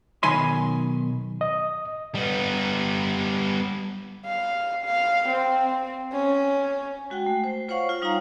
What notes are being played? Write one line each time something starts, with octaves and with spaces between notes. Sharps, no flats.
B1 D#3 G#5 B5 C6
D#5
G3 B3
F5
F5
C4
C#4
G#3 F#4 F#5 G5
A3
C5
F4 C5 C#5 F5 F#5 C#6
F4 F#5
G3 D#4 F4 C#5 F5 A#5